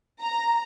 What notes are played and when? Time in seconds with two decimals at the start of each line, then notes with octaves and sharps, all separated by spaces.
0.21 A#5